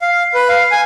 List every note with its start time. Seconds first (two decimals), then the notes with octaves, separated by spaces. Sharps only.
0.02 F5
0.34 B4
0.49 F5
0.71 G#5